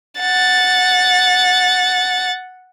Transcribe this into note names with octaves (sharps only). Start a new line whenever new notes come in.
F#5 A6